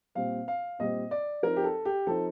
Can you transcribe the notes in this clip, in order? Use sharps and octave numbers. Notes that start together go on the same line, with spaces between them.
A#2 G3 C4 F5
F5
A#2 G3 C4 D#5
D5
F3 C4 D#4 A#4
G4
A4
G4
F3 C4 D#4 A4